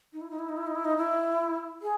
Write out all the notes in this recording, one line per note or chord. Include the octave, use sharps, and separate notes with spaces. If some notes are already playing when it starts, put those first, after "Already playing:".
D#4
E4
D#4
E4
D#4
E4
D#4
E4
D#4
E4
G#4